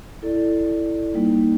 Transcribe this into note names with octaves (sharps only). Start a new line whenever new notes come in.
E4 A4 D5
G3 A#3 D#4